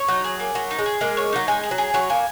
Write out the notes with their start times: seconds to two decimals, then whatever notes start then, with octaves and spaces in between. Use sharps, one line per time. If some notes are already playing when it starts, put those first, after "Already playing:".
Already playing: C#5
0.08 F#3 D#4
0.24 G#4
0.40 A#3
0.55 F#3 C#5
0.71 D#4
0.79 G#3
0.86 G#4
1.01 G#3 A#3
1.17 C#5
1.32 F#3 D#4
1.48 G#3 G#5
1.64 G#4
1.71 F#3
1.78 G#4
1.94 F#3 C#5
2.10 A#3 G#5